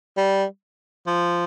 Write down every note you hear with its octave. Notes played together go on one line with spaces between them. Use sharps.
G3
F3